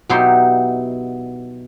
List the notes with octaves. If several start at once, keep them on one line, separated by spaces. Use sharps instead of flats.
B2 F#3 D#4 E4 G4 C6